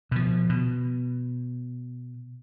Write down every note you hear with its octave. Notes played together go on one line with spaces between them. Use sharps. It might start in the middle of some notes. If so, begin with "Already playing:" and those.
B2 F3
B2